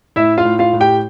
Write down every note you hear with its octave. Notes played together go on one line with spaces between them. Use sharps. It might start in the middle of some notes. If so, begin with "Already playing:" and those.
A2 E4 E5
F4 F5
A2
F4 F5
A2
G4 G5